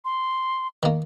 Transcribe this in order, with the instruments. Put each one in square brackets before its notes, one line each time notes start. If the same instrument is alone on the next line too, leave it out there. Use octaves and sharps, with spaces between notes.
[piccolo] C6
[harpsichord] D#3 A#3